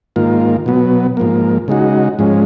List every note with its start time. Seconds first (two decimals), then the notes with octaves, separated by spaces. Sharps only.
0.16 G#2 D#3 A#3 F4
0.66 B2 F#3 B3
1.17 G#2 F3 A#3
1.68 C#3 G#3 D#4 F#4
2.19 G#2 F3 G#3 C#4